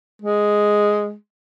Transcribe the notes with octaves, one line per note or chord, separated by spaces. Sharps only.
G#3